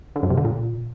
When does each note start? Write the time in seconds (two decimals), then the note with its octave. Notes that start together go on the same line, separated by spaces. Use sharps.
0.16 D3
0.23 F#2
0.30 C3
0.37 D3
0.45 A#2